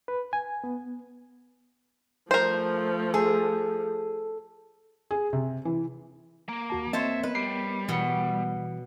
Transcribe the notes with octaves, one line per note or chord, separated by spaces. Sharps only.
B4
G#5
B3
F3 A3 A#4 C5
G#4 A4
G#4
C3
E3
A#3
D#2 F#4 A5
A#3 C4 C5 C#5 D#5 E5 A5
B3 A#4 B4 D#5
G3 C7
B2 E3 C#7